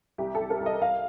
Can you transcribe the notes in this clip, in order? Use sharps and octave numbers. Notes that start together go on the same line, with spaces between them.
C2 G4
C2 A4
A#4
C2
D#5
C2 F5